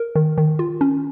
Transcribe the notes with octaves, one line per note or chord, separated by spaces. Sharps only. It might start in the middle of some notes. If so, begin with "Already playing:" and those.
Already playing: A#4
D#3
D#3
F4
C#4